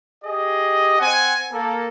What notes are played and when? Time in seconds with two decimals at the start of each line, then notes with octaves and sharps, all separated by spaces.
0.24 G4 G#4 D#5
0.99 C4 F#5 G#5
1.52 A#3 A4